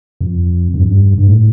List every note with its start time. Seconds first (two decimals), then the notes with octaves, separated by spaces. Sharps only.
0.21 F2
0.74 G2
0.81 F2
0.88 G2
1.18 G2
1.27 A2